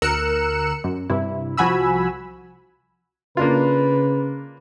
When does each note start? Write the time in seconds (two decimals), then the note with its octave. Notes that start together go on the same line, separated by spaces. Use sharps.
0.02 D2 A#4 E6 F#6 C#7 E7
0.84 F#2
1.10 G2 C3 E4
1.57 C2 F3 F#4 G#5 B5 E6
3.37 C#3 A#3 D4 F4 B4